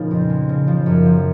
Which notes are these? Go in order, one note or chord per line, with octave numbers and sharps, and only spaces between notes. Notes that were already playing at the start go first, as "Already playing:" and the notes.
Already playing: A#2 C#3 F3 G#3 B3 D#4
F2
G#3
C#3
F3
F#2
F3